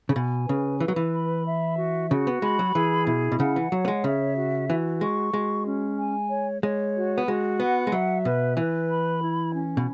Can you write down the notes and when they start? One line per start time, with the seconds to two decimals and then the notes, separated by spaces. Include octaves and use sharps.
0.09 C#3
0.16 B2 G#5
0.49 C#3 B4
0.80 E3 B4
0.88 F#3
0.96 E3
1.13 B5
1.46 E5
1.79 F#4
2.11 C#3 F#4
2.27 B3
2.42 G#3 B5
2.59 F#3
2.75 E3 G#4
3.07 B2 E4
3.32 B2
3.39 C#3 F#5
3.56 E3
3.72 F#3 C#5
3.85 B3
3.88 G#3
4.04 C#3 E5
4.36 F#4
4.69 E3 F#4
5.01 G#3 C#6
5.34 G#3 F#4
5.66 C#4
5.98 G#5
6.31 C#5
6.63 G#3 C#5
6.96 F#4
7.18 B3
7.27 G#3 F#4
7.60 B3 F#5
7.87 G#3
7.92 F#3 E5
8.25 B2 B4
8.57 E3 B4
8.89 B5
9.22 E4
9.55 C#4
9.77 B2